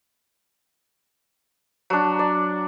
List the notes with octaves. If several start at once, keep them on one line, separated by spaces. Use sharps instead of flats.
F#3 D4
D5